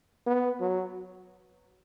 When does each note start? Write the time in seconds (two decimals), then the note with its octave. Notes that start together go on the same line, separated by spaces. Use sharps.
0.26 B3
0.60 F#3